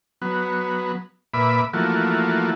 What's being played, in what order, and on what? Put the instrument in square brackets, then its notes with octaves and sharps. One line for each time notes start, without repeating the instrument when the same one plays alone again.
[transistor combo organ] F#3 B3
A#2 B4 E5 B5 D6
E3 F3 A3 A#3 F#4